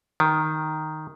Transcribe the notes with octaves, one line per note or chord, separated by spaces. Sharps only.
D#3